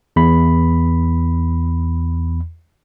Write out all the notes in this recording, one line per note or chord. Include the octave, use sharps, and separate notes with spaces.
E2 B5